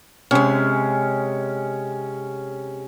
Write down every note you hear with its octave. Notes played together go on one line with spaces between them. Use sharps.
C3 G#3 C#4